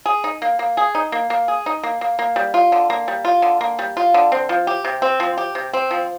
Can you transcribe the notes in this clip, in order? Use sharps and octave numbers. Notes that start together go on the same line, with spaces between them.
G#4
D#4
A#3
A#3
G#4
D#4
A#3
A#3
G#4
D#4
A#3
A#3
A#3
G3
F4
D3
A#3
G3
F4
D3
A#3
G3
F4
D3
C4
F3
G4
C3
C4
F3
G4
C3
C4
F3